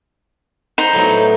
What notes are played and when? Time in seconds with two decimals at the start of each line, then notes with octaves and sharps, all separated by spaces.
0.78 D#4 C5
0.93 A2 F#3 B3